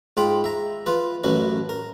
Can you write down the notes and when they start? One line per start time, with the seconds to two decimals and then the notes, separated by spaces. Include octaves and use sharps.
0.17 G#2 F4 G5 B5
0.44 E5 A#5
0.86 F4 B4
1.24 A1 F#2 F#3 B4
1.69 A#4